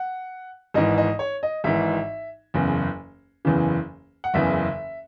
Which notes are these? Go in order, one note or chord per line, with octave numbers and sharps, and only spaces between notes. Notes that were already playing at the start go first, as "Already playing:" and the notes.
Already playing: F#5
G#1 G#2 E3 D#5
D#5
C#5
D#5
G#1 G#2 E3 E5
F#1 E2 C#3 E3
F#1 E2 C#3 E3
F#5
F#1 E2 C#3 E3 E5